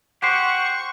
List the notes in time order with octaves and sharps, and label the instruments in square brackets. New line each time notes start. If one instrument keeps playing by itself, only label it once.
[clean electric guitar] G4 C5 [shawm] F#5 [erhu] C#6